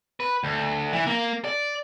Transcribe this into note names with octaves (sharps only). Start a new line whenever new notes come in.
B4
D2
E3
A#3
D5